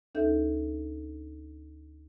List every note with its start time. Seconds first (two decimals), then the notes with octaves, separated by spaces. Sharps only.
0.15 D2 C#4 D#4 A4 E5 G6